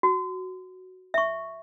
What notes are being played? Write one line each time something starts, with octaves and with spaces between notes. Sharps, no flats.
F#4
E5 C#6